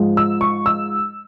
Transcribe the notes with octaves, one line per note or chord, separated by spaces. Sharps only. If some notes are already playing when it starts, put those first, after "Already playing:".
Already playing: G#2 F3 G#3
E6
C#6
E6